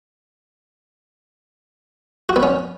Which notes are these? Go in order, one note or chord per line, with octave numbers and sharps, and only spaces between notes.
F#4
B3
C#4